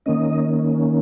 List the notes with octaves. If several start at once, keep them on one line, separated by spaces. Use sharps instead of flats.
D#3 A#3 C#4 D#5